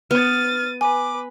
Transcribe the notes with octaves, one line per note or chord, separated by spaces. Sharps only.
B3 F6 A6 D#7
B4 G#5 D6